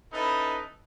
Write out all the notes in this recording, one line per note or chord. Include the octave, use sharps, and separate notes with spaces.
C#4 D#4 E4 A4 B4